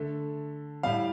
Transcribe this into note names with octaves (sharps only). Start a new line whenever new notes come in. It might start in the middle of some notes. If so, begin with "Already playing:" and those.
Already playing: D3 A3
A2 G3 F5